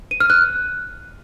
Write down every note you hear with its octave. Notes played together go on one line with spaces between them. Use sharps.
D#7
F6
F#6